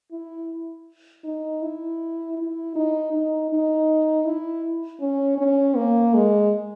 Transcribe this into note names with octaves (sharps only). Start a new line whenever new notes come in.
E4
D#4
E4
E4
D#4
D#4
D#4
E4
C#4
C#4
A#3
G#3